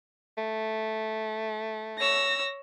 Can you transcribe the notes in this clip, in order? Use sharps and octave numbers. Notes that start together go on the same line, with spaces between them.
A3
C#5 E6 A#6